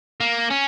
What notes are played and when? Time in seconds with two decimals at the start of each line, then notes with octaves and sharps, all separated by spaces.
0.21 A#3
0.51 C#4